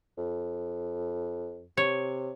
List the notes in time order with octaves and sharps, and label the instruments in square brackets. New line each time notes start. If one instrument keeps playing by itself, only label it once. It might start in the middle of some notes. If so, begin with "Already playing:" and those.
[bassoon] F2
[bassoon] C3 [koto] C#5